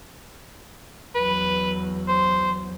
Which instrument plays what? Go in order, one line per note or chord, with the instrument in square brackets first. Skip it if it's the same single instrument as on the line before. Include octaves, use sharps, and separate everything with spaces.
[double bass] E2 F#3 [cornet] B4
[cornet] C5